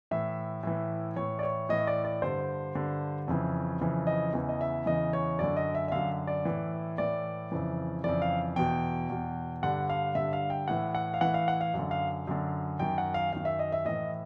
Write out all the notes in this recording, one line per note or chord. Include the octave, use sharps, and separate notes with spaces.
A2 E3 E5
A2 E3
A2 E3 C#5
D5
C#5
A2 E3 D#5
D5
D5
G2 D3 C5
G2 D3
F2 C#3 E3
F2 C#3 E3
D#5
E2 C#3 E3
D#5
E5
E2 C#3 E3 D#5
C#5
F#2 D3 D5
D#5
E5
E5
F#2 D3 F5
D5
A2 E3
A2 E3 D5
F2 C#3 E3
F2 C#3 E3 D5
F5
E2 B2 G5
E2 B2
G2 D3 F#5
F5
G2 D3 E5
F5
G5
A2 E3 F#5
F#5
F5
A2 E3 F#5
F5
F#5
F5
F#2
D3
F5
F#2 D3
F#2 D#3 G5
F#5
F5
F#2 D#3 F5
E5
D#5
E5
A2 E3 D#5